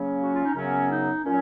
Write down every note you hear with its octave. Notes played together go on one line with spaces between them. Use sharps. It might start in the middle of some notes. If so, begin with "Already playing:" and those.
Already playing: C#3 F#3 A#3 C#4
F#4
F4
D#4
F#2 C#3 F#3 B3 C#4
D#4
A#2 F#3 C#4